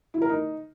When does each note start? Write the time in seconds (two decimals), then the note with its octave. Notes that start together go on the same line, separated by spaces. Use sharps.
0.14 E4
0.22 A#4
0.29 D#4